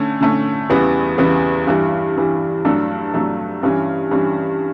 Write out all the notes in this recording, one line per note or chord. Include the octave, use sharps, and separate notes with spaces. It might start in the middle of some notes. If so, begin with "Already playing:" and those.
Already playing: D3 A3 C#4
D3 A3 C#4
E2 C#3 E3 G3 B3
E2 C#3 E3 G3 B3
G2 E3 G3
G2 E3 G3
G2 F#3 A3 D4 A4
G2 F#3 A3 D4 A4
G2 E3 G3 C#4
G2 E3 G3 C#4